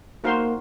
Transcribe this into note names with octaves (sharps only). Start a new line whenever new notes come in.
A#3 D#4 F#4 C5 F5 C6